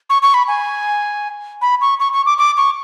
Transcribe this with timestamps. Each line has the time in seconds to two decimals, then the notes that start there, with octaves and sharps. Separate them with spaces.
0.10 C#6
0.22 C#6
0.34 B5
0.48 G#5
1.62 B5
1.81 C#6
2.00 C#6
2.13 C#6
2.26 D6
2.38 D6
2.57 C#6